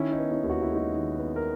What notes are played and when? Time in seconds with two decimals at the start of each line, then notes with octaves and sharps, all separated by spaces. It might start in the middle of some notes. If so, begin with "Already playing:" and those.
Already playing: D#3 C#4 E4
0.12 D#4
0.18 B3
0.31 C#4 E4
0.43 D#2
0.50 F#4
0.62 E4
0.69 G#3
0.75 D#4 F#4
0.94 D#3
1.18 B3
1.36 A#4